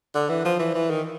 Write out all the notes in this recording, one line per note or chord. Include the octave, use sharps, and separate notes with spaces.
D3
E3
F3
E3
E3
D#3